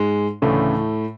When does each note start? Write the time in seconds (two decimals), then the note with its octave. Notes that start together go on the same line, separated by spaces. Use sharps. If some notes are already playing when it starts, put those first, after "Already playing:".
Already playing: G#2 G#3
0.42 D2 A2 C#3 E3 A3